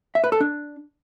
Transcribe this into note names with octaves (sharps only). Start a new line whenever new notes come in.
E5
B4
A4
D4